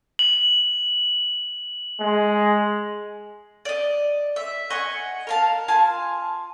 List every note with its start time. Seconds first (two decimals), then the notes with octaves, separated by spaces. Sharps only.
0.19 F#7
2.00 G#3
3.65 D5 D#5
4.36 E5
4.70 D#5 F#5 G#5 C#6
5.27 A#4 F5 A5
5.68 F4 G#5 A5